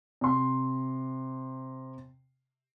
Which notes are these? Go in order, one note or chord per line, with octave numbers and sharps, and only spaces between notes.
C3 C6